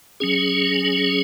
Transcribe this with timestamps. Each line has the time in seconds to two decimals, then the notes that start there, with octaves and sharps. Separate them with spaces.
0.20 F#3 C#4 G#4